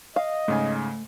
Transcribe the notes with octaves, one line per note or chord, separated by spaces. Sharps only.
D#5 F5
G#2 C#3 A3 G#5